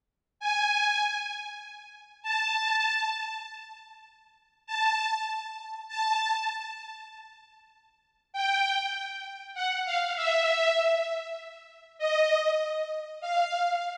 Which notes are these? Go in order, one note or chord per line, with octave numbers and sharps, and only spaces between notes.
G#5
A5
A5
A5
G5
F#5
F5
E5
D#5
F5